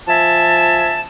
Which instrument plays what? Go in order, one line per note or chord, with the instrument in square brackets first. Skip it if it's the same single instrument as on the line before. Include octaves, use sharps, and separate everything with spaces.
[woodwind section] F3 E5 G#5 A5